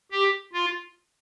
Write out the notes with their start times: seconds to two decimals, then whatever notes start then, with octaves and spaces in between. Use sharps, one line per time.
0.11 G4
0.53 F4